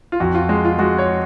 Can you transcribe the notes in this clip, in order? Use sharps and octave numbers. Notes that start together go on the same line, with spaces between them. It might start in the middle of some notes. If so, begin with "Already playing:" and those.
F4
F2 F#4
F4
G#3
F4
G#3 F#4
C#5